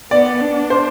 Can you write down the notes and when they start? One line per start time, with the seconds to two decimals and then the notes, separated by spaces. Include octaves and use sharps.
0.11 B3 D5
0.41 D4
0.70 C5